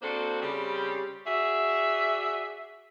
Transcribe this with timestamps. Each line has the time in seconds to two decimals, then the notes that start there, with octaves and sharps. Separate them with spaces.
0.02 A#3 C4 D4 F#4 A4 C5
0.42 C#3 G3 C4 G4
1.26 F#4 G#4 D5 E5